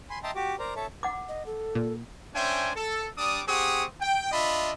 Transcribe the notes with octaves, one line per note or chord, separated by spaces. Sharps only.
G#5 B5 C6
D#5 E5 G5 A5 A#5 C6
F#4 G4 D6
A#4 C5 D5 A#5
A4 C#5 E5 A5
F#5 D6
D#5
A4
A#2
C#4 D4 C5 E5 G5 G#5
A4
G3 D4 D6 D#6
C4 G4 G#4 F#5 C#6 D#6
G5
D4 F4 D#5 E5 B5